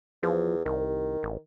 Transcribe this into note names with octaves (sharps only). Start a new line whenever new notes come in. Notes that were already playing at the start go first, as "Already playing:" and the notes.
E2 F3
C2 D#3
A1